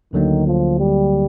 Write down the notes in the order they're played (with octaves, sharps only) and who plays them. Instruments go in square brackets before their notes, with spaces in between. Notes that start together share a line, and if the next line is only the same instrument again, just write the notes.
[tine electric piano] D2 D3 F#3 A#3 [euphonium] D#3
[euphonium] F3
G3